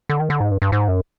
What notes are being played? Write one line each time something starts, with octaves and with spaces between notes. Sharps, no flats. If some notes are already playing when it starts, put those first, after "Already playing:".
D3
D#3
D3
G#2
G2
G2
G#2
F#2